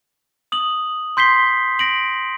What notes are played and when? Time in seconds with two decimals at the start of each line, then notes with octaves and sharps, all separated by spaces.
0.52 D#6 F#7
1.17 C6 G6 B6 C7 G7
1.79 A#6 D7 F#7